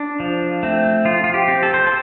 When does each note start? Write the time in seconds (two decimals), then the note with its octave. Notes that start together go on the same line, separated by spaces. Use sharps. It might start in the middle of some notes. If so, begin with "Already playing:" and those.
Already playing: D4
0.20 F3
0.63 A3 C4
1.05 F3 F4
1.24 F4
1.34 G4
1.48 C4
1.63 A4
1.74 C5
1.87 A4